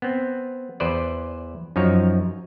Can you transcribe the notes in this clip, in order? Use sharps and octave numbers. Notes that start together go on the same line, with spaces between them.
B3 C4
E2 B4 C5 D5
F#2 F3 D#4 C#5